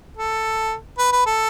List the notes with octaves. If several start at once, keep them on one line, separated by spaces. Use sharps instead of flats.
A4
B4
B4
A4